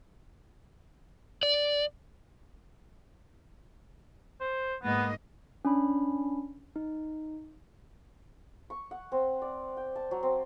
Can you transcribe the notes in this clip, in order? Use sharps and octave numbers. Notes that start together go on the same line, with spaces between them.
D5
C5
G#2 A#3 B3 D#5
C#4 D4 B5
D#4
C#6
F#5
C4
D5
G5
A5
F#3
C4